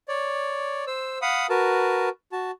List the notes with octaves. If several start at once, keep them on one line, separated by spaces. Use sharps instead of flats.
C#5 D5
C5 E6
F5 F#5 B5 D#6
F#4 A#4 B4 A5
F#4 A5